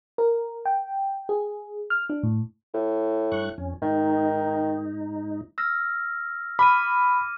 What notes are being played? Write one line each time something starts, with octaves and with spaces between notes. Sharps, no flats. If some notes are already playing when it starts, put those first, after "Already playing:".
A#4
G5
G#4
F6
D4
A2
A2
G2 C#6 F#6
F2 C#4
G#2 D#3 D#4
E6 F6 A#6
B5 D6 F6 D#7